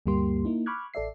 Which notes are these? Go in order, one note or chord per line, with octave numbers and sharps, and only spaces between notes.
D2 G2 G3 A#3 G4 C6
A#3 D#4 E4
B5 C#6 D6 F6 F#6 G#6
A1 A4 D5 E5 C7